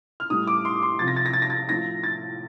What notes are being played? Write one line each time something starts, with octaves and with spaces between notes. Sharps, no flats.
F6
A2 G3 D#6
D6
C6
C6
C3 F3 A6
A#6
A6
A#6
A6
A#6
A6
A2 F3 A#6
A6